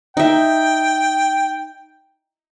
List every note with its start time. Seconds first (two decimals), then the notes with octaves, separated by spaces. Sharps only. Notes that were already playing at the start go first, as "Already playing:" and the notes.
0.17 D#4 E5 G5